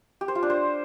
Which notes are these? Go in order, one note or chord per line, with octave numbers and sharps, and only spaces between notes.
G4
C5
F4
D4
C5